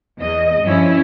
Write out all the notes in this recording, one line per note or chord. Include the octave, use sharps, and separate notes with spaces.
E2 D#5
G2 F3 C#4 E4